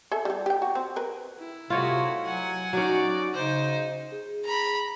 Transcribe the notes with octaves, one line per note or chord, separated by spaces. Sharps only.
G#4 A4 E5
G3 G4
G4 G5
F#4
C4
A#4 B4
E4
C3 A3 F4 F#4 C#5 D#5
F#3 F#5 G#5
F#3 C#4 D#4 F#4 D5
C#3 D#4 C5
G#4
A#5 B5